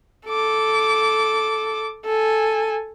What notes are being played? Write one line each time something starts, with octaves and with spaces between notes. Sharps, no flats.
A4 D6
A4 G#5